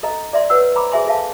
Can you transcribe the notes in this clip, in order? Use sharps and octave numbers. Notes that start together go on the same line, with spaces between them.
A4 D#5 A#5
D5 E5 C6
B4 C#5 F#5 E6
C5 A#5 B5 D6
G#4 C5 E5 G#5 C6
A4 E5 F5 A5